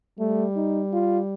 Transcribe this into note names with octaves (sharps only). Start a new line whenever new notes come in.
G3 A3
D#4
F4